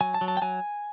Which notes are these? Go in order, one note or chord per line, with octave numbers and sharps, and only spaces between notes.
F#3 G#5
A5
F#3
A5
G5
F#3 G#5